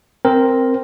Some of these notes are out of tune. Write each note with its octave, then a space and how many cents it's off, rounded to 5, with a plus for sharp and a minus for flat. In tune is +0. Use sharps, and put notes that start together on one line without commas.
C4 +0 A#4 +0